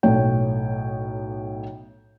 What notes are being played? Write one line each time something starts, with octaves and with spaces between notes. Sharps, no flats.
B1 A2 C#5 G5